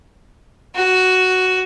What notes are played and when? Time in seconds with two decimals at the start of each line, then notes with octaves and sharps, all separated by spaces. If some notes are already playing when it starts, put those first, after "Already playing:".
0.75 F#4